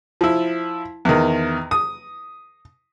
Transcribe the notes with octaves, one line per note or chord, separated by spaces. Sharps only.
F3 E4
E2 D#3
D#6